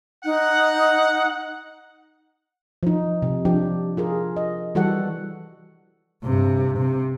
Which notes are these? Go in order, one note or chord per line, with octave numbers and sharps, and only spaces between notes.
D#4 F#5
F3 D#4
C3
F3 D4 G4
F4 G#4 A#4
D#5
E3 G3 F#4 A4 F#5
G2 C3
C3